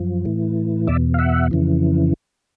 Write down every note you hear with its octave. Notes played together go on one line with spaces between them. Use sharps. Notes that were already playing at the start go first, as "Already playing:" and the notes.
Already playing: F#2 F3
A2 E3
E2 B2 D5 E5
F5
E5 F#5
F2 C#3 E3